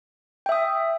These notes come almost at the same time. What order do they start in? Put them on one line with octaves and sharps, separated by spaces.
G5 E5 D#6